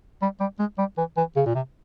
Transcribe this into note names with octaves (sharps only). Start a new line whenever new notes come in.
G3
G3
G#3
G3
E3
E3
C#3
A#2
C3